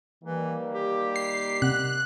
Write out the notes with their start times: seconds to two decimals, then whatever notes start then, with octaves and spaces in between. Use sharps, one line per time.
0.24 D#3 E3 G3 A#3
0.74 G4
1.16 C7
1.62 C3 F#5 F#6